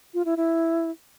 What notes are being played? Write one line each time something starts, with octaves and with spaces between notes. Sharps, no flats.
F4
E4
E4